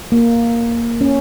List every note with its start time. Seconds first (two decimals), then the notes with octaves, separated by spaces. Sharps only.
0.12 A#3
1.01 C#4